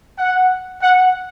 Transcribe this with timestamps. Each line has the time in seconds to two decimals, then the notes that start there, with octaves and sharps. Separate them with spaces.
0.18 F#5
0.82 F#5